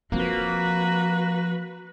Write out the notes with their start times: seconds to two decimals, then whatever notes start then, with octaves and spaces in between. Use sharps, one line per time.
0.12 F3 A#3 C4 F#4 B4